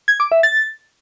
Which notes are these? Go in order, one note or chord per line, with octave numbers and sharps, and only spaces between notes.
G#6
D6
E5
A6